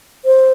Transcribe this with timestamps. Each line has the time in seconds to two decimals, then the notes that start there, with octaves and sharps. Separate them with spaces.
0.25 C5